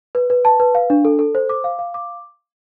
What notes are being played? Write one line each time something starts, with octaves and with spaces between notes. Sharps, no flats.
B4
B4
A5
B4
F5
D4
A4
A4
C5
D6
F5
F5
D6